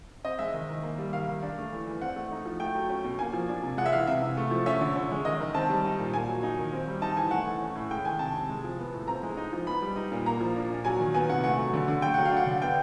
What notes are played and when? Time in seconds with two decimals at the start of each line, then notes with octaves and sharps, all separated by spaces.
0.25 C4 D#5
0.39 G#3 E5
0.54 D#3
0.69 D#3
0.83 A#3
0.98 G3
1.13 D#3 F5
1.27 D#3
1.43 D4
1.58 A3
1.72 E3
1.86 E3
2.01 C4 F#5
2.16 A3
2.31 D#4
2.46 F3
2.60 A3 G5
2.75 F#3
2.89 C#4
3.04 B2
3.19 A#3 G#5
3.33 F3
3.48 D4
3.63 C3
3.78 G#3 F#5
3.86 E5
3.92 E3 F5
4.07 C3 E5
4.22 C3
4.37 A3
4.51 F3
4.66 C#4 E5
4.81 D3
4.96 C#4
5.11 G#3
5.25 D#3 D#5
5.40 D#3
5.55 C4 A5
5.69 G3
5.85 D#4
5.99 A#2
6.13 A#3 G#5
6.28 F#3
6.43 D#4
6.58 D#3
6.73 C4
6.87 G3
7.02 D#4 A5
7.17 E3 G#5
7.31 A3 F#5
7.46 E3
7.62 C#4
7.75 A2
7.90 G#3 G5
8.05 D#3 G#5
8.19 C3 A5
8.34 C3
8.49 G#3
8.64 F3
8.79 B3
8.94 A2
9.08 C4 A#5
9.23 G#3
9.37 D#4
9.53 F3
9.67 B3 B5
9.82 G3
9.96 D#4
10.12 A#2
10.26 A#3 A#5
10.41 F3
10.56 D4
10.70 A#2
10.85 F#3 G#5
11.00 D#3
11.14 B3 G#5
11.29 C3 F#5
11.44 A3 F#5
11.58 F#3
11.74 D3
11.88 D3
12.02 A3 G5
12.14 F#3 F#5
12.25 F5
12.32 D4 F#5
12.46 D3
12.62 B3 G5